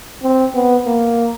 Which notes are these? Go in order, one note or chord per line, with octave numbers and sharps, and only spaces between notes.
C4
B3
A#3